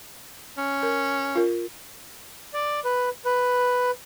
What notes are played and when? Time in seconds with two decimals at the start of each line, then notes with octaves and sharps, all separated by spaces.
0.58 C#4
0.83 A#4
1.35 F4 A#4
2.54 D5
2.85 B4
3.25 B4